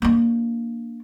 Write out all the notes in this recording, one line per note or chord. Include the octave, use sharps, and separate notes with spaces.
A#3 D4